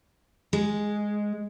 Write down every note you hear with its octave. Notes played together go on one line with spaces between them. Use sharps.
G#3